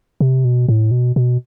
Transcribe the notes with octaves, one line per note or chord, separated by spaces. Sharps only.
C3
B2
A2
B2
B2